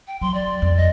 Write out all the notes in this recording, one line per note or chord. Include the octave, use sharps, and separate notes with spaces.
G5
F#3 C6
D5
F2
D#5